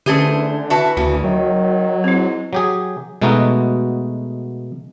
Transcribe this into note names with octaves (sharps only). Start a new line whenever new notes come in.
D3 E3 A3 C#4 G4 G#4 C5
E3 F#4 E5 A5
D2 C#3 A#3 F#4
D#3 F#3
G#2 C4 E4
F#3 G4 G#4
B2 G#3 A3 B3 D#4 F#4